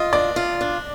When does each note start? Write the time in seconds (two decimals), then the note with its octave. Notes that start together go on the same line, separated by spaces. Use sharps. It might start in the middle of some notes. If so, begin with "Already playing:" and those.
Already playing: F4 D#5
0.13 D4 D5
0.36 F4
0.61 D4